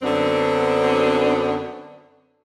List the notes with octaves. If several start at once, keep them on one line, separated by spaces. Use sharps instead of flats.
F#2 D3 F#3 B3 C4 D4